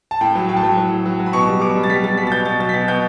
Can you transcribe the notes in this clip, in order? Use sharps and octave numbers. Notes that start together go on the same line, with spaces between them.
A5
A2 G5
F#3
A2 G5
A5
F#3 G5
F#3
A2
F#3
F#3
B5
B2 C#6
G3
B2 D6
G3
A6
G3 B6
G3 A6
B2 B6
A6
B2 G6
B2 A6
F#3 A6
B6
B2 A6
B2 G6